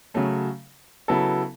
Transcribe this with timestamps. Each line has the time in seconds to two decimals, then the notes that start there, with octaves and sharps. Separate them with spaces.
0.14 C#3 F#3 A3 C#4
1.08 C#3 F#3 B3 E4 A4